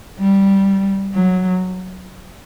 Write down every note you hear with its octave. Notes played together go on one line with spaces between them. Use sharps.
G3
F#3